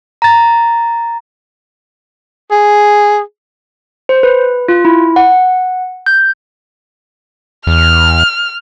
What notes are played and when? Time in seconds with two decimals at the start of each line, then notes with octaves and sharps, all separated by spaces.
0.22 A#5 A6
2.51 G#4
4.09 C5
4.23 B4
4.68 F4
4.85 E4
5.16 F#5
6.06 G6
7.67 E2 F6